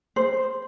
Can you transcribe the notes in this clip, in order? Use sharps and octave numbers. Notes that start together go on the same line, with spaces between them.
C5